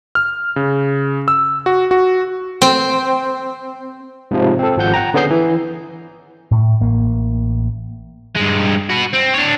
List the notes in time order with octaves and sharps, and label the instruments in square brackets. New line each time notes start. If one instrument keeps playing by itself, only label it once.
[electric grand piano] F6
C#3
E6
F#4
F#4
[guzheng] C4
[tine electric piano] G#2 C3 F3
C4 A4
G#1 F3 F#5 G6
F#5 G5 A#5
D3 B3 C#4 G#4 G6 C7
E3
[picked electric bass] A2
A1 A#3
[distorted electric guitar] G2 G#3
F#4 B4
C4
D4 C#5